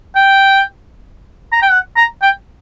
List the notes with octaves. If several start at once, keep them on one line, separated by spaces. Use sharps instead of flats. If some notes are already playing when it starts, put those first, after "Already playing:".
G5
A#5
G5
F#5
A#5
G5